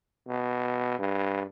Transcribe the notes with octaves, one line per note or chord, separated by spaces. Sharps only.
B2
G2